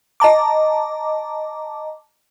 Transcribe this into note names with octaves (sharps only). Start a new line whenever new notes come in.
D#5 A5 A#5 D6